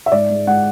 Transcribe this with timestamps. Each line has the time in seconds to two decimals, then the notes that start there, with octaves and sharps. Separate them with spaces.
0.06 E5
0.12 G#2 D5
0.30 G#3
0.47 G#3 F#5